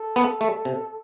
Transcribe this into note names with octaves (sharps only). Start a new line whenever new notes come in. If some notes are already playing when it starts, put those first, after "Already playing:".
Already playing: A4
B3
A3
C3